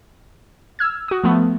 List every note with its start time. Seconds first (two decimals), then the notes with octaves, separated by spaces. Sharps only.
0.79 E6 F6 G#6
1.08 F#4 D#6
1.24 F3 A3 B3